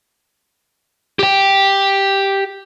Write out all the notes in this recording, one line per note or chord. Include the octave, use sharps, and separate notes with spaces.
G4 G5